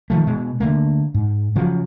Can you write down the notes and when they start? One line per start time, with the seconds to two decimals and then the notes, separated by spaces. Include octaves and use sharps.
0.10 D#3 F3 A3
0.27 B2 G#3
0.60 D3 E3 A3 A#3
1.14 G#2
1.56 C#3 F3 F#3